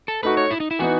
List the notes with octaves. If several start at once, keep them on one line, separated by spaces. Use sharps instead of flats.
A4
A3 D#4 F#4 B4
C#5
E4
D#4
E4
E3 B3 D#4 F#4